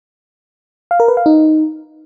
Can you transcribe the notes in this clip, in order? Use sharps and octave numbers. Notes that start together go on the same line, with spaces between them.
F5
A#4
B4
F5
D#4